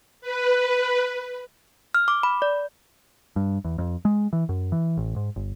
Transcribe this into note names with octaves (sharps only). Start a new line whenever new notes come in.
B4
F6
D6
B5
D5
G2
E2
F2
G#3
E3
F#2
E3
A1
G#2
G1